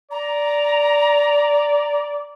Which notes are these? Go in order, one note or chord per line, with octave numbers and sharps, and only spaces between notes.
D5 A#5